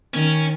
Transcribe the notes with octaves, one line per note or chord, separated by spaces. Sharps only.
D#3 C#4